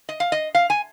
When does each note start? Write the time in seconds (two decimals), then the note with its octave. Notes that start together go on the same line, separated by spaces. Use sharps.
0.09 D#5
0.20 F5
0.32 D#5
0.55 F5
0.70 G#5